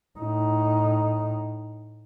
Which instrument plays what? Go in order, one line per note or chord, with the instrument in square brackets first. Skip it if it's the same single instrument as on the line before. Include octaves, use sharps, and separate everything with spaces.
[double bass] A2 D#4